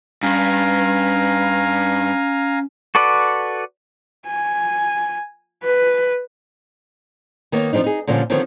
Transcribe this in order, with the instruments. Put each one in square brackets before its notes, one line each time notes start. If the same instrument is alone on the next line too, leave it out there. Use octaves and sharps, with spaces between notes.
[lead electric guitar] G2 [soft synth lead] C#4 [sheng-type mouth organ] F5 G#5 A#5
[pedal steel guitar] F#4 A4 B4 D5 F#5
[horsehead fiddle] G#5
B4
[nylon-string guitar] D#3 A#3 B3 C#5
F3 A3 C4 D4 D#4
D#4 G#4
A#2 D3 F3 G3 C#4
D3 D#3 F3 B3 C4 C#5